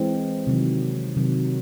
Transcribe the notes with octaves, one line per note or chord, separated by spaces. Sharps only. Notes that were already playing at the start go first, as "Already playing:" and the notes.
Already playing: E3 G#3 C4
C3 D#3 F#3
C3 D#3 F#3